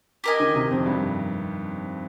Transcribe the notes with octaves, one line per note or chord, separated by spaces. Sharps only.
G4 A#4 D#5 G#5
D#3
C3
F2
G2